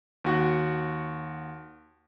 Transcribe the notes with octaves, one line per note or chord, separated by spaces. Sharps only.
D#2 F#4 F#5